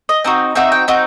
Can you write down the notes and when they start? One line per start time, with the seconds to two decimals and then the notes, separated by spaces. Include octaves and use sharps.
0.09 D#5
0.24 C4 D#4 F#4
0.55 C4 D#4 F#4 E5
0.72 G5
0.88 C4 D#4 F#4